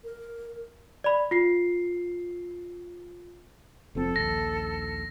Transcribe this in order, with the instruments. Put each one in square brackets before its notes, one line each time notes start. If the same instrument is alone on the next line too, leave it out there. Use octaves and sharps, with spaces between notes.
[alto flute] A#4
[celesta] D5 B5
F4 C7
[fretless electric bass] F1 F3 C4 [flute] A4
[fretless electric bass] A#1 D#2 [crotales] A#6